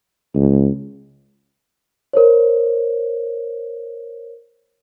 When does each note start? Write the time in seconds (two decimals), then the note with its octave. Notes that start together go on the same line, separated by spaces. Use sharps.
0.35 C#2
2.13 A#4 C5 C#5